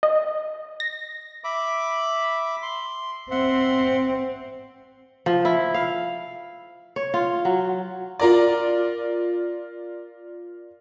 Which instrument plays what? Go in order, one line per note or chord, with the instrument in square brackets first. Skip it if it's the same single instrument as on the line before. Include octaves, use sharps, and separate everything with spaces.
[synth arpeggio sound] D#5
A#6
[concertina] E5 B5 D6
C6
[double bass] C4 [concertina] E5 F#5 C6
[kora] F3
E4
F5
C#5
F4
F#3
[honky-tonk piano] F4 A#4 D5